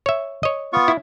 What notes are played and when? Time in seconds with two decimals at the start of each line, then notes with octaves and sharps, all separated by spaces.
0.06 C#5 E5
0.43 C#5 D#5
0.73 B3 F4 C#6
0.88 E4